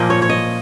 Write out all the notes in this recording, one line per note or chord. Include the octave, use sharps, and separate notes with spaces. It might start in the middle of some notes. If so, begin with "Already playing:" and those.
Already playing: A#2 F3 A#3 D#5
C#5
C#5
D#5